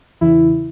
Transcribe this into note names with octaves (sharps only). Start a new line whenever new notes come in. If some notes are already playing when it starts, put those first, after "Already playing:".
E2 C#3 E3 E4